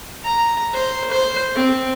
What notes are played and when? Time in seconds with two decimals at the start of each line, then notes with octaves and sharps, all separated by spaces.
0.24 A#5
0.74 C5
1.11 C5
1.55 C4